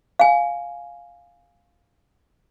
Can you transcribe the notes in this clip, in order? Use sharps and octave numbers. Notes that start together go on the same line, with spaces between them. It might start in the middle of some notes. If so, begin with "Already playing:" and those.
F5 G#5